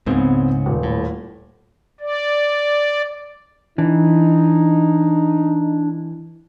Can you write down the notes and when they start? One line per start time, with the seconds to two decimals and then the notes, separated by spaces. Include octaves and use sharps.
0.06 C#2 G#2 C#3 B3 C4
0.66 D#1
0.83 A2
2.00 D5
3.78 E3 D4 D#4